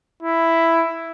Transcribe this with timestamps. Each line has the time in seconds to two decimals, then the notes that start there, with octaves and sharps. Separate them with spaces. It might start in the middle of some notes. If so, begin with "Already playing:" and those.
0.22 E4